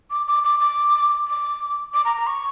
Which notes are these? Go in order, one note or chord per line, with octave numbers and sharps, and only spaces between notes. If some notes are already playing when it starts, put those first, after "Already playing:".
D6
D6
D6
D6
D6
D6
A#5
A#5
C#6